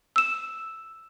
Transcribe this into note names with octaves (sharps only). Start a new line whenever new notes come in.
E6 E7